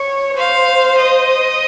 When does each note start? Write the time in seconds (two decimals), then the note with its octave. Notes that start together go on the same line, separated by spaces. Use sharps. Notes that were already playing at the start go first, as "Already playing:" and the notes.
Already playing: C#5
0.37 C5 F5
0.98 D#5